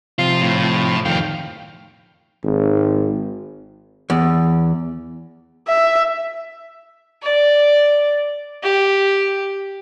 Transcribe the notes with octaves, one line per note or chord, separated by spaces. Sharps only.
C3 F3 F4
A2
F2 D#3 F5 G5
G#1
E2
E5
D5
G4